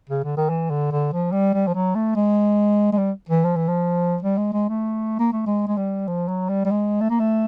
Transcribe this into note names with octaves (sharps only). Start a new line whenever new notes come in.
C#3
D3
D#3
E3
D3
D3
F3
G3
G3
F3
F#3
A3
G#3
G#3
G3
E3
F3
E3
F3
G3
G#3
G#3
A3
A#3
A3
G#3
G#3
G3
F3
F#3
G3
G3
G#3
A3
A#3
A3